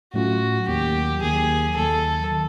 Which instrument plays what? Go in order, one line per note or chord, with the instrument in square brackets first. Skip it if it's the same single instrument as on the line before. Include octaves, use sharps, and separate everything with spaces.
[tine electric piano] A2 F#3 A3 C#4 F4 [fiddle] F#4
[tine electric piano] D#2 D#3 F#3 A#3 [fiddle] G4
[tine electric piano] D#2 D#3 F#3 A#3 [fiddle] G#4
[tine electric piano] D#2 D#3 F#3 A#3 [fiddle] A4
[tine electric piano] D#3